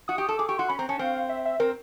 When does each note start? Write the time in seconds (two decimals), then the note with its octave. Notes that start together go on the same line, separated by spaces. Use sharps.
0.08 F#4 D#6
0.18 G4
0.29 A4
0.38 G#4 D6
0.48 G4 C#6
0.58 F#4 C6
0.69 C#4 B5
0.79 C4 A#5
0.89 C#4 A5
0.99 C4 F5
1.29 E5
1.46 E5
1.60 C4 A#4